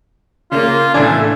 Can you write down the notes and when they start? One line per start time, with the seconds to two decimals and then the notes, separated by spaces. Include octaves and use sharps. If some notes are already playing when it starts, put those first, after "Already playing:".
0.52 C#3 A#3 F4
0.94 A2 E3 A3 D4 G#5